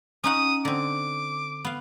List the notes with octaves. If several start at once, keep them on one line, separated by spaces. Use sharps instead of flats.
C#4 D#4 F#5 D#6
D3 C4 D6
B3 F5